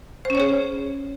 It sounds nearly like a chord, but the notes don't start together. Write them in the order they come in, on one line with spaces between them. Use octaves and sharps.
C5 C#4 C#5 G#4